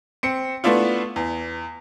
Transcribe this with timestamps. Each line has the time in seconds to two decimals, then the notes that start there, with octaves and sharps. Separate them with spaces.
0.23 C4 C#7
0.64 A3 B3 D4 E4 F4
1.16 E2